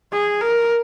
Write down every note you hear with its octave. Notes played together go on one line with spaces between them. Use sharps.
G#4
A#4